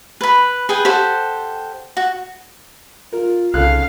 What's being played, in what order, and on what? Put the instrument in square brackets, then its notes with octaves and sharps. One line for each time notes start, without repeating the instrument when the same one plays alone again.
[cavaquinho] B4 B5
G#4 B4 G5
G4 A4 C5 F#5
F#4
[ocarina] F4 [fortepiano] A#4
[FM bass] C2 [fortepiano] C#3 A4 F#6 [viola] F5